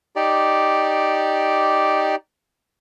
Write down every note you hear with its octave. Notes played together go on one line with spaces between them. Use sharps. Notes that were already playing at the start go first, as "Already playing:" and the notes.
D#4 G4 D5